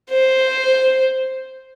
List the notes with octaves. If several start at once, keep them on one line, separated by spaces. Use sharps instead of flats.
C5